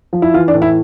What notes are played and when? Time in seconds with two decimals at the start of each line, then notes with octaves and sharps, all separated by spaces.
0.13 F3
0.22 E4
0.34 E3 F4
0.48 D4
0.54 A2
0.62 E4